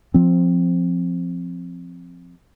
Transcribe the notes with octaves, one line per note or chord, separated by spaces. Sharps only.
F3 C4